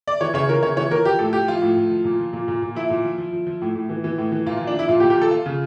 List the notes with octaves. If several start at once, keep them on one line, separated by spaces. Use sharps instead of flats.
D5
E3 C#5
C#3 C#5
E3 A#4
C#3 C#5
E3 C#5
E3 A#4
F3 G4
A2 A4
F3 G4
F3 F4
A2
A2
F3
A#2
F3
A#2
A#2
A#2
F3 E4
A#2
F3
F3
F3
F3
A2
A2
E3
E3
A2
E3
A#2 F4
F3 F4
D4
F3 E4
A#2 F4
G4
A#2
G4
F3 A4
F3 F4
C#3